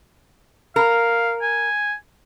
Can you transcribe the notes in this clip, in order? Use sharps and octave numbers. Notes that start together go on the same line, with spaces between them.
A#4 F5
G#5